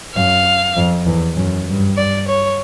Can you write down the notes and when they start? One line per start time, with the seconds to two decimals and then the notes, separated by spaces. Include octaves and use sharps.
0.15 F#2 F5
0.76 F2
1.06 E2
1.37 F#2
1.67 G2
1.97 D5
2.28 C#5